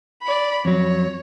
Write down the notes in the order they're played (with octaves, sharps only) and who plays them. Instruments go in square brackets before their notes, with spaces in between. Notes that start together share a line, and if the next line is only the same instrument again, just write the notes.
[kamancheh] D5 B5
[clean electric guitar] F2 F#3 [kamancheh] C#5